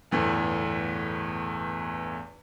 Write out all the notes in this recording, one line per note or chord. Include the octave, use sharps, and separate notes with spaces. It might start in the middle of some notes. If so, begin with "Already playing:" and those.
G1 E2 A2